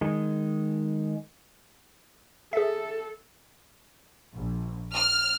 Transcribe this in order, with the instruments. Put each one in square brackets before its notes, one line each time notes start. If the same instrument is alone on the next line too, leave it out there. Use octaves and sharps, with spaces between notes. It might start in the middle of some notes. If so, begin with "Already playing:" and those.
[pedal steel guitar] D#3 G#3
[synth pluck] G#4 E5 [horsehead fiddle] A4
[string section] A#1
F6